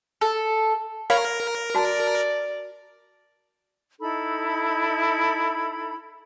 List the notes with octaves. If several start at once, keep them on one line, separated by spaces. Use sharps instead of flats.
A4
A#4 C#5 F5 B5
F#4 D5 A5
D#4 E4 A4 B5